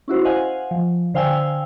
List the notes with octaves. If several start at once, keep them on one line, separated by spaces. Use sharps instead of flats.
C#4 E4 F#4 C5
C5 D#5 F5 F#5 G#5
F3
D3 C5 F5 G5 G#5 E6